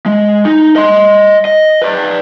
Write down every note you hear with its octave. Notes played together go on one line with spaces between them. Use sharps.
G#3
D#4
D#5 C6
D#5
B4 D5